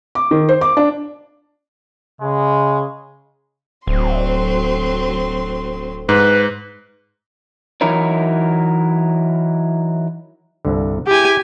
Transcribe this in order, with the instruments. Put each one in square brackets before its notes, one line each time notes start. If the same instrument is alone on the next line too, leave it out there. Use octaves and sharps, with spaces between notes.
[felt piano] D6
D#3
C5
D6
D4
[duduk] C#3 [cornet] G#3
[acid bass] D1 [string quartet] F#3 C4 C6
[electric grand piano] G#2 [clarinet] B4
[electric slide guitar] E3 F#3 D#4 E4 A#4 C#5
[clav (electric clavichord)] C2 G2 D3
[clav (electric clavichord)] E4 G#4 [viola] G4 G#5